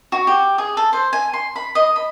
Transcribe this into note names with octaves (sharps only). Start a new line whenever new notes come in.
F#4
G4
G#4
A4
C5
G#5
C6
B5
D#5
B5